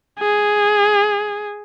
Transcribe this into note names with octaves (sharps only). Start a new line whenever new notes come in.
G#4